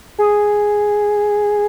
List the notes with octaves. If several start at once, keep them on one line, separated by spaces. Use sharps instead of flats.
G#4